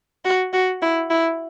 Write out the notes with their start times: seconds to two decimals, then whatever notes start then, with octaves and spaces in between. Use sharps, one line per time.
0.25 F#4
0.53 F#4
0.82 E4
1.10 E4